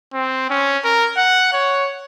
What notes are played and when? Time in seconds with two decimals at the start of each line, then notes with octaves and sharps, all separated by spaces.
0.14 C4
0.50 C#4
0.84 A#4
1.16 F#5
1.53 C#5